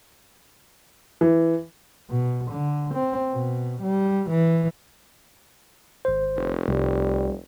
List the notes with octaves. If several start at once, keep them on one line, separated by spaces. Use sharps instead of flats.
E3
B2
D3
C4
B2
G3
E3
G#1 C5
F1
C2 G3